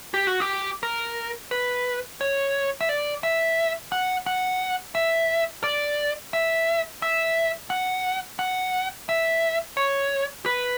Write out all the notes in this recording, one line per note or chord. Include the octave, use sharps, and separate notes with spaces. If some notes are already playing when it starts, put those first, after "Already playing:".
G4
F#4
G4
A#4
B4
C#5
E5
D5
E5
F#5
F#5
E5
D5
E5
E5
F#5
F#5
E5
C#5
B4